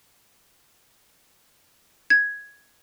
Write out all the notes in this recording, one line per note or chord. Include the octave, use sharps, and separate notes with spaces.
G#6